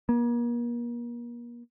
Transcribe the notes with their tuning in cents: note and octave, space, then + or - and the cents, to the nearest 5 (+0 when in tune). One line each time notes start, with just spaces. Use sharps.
A#3 +40